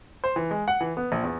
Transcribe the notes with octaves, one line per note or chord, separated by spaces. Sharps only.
C5
E3
G#3
F#5
E3
B3
A#1
E2